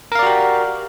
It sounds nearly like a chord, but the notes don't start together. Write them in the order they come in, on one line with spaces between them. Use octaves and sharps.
A#4 F5 D5 F#4 G4